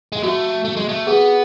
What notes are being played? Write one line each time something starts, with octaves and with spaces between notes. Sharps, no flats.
G#3
A3 F#4
A3
G#3
A3
B3 G#4